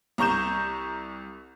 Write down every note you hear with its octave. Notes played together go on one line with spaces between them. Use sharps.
C2 A#5 C#6 G6 E7